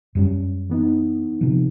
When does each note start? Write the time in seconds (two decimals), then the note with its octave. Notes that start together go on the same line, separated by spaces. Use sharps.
0.15 F#2 G3 C#4
0.70 E3 B3 D#4
1.41 C3 F3